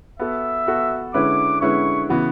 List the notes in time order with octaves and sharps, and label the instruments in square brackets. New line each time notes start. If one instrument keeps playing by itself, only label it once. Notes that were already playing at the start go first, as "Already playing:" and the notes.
[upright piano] B3 F#4 A4 [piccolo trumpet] E5
[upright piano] B3 F#4 A4
[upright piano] D3 G#3 C#4 E4 B4 [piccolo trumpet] D6
[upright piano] D3 G#3 C#4 E4 B4 [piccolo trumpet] C#6
[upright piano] C#3 E3 B3 F#4